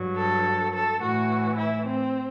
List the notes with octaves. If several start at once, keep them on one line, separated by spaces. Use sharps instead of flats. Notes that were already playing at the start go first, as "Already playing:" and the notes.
Already playing: G2 F#3
A4
A4
A2 E3 F#4
E4
C4